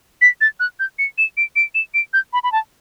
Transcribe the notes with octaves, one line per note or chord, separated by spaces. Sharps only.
B6
A6
F#6
G6
C#7
E7
D7
D7
E7
D7
G6
B5
B5
A5